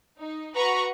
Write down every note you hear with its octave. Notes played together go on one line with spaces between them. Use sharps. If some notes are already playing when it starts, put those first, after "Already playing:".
D#4
F#4 B4 A#5 C#6